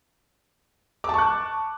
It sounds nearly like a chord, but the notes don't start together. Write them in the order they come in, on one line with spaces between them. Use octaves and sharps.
D6 A5 C#6 F#6